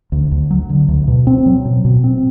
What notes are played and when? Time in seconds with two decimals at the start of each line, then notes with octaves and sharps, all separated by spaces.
0.12 D2
0.31 D2
0.51 F#3
0.69 D3
0.88 D2
1.08 B2
1.27 C4
1.46 F#3
1.65 B2
1.85 B2
2.04 C4